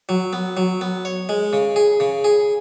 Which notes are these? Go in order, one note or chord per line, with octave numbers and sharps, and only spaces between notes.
F#3
B3
F#3
B3
C#5
G#3
C#3
G#4
C#3
G#4